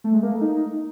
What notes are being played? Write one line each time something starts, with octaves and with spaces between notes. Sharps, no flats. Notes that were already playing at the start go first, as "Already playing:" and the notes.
A3
G#3
A#3
A3
D#4